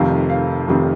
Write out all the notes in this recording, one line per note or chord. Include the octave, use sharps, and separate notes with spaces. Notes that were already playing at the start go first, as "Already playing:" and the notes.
Already playing: F1 F2 C3 D#3 F5
F5
F1 F2 C3 D#3